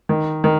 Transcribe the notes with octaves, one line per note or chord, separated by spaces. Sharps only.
D#3
D#3